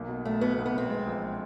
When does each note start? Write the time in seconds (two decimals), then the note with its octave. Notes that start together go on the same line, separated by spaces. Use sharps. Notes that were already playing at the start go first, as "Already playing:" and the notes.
Already playing: B1 A#3
0.08 B2
0.25 B1 A3
0.41 B2 B3
0.58 B1
0.65 B3
0.74 B1 C4
0.90 G#3
1.07 A#1